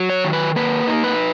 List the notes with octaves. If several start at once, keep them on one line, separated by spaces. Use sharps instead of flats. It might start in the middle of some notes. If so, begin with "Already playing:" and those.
Already playing: F#3
C#5
D#3
B4
A#3 B4
D#4
B4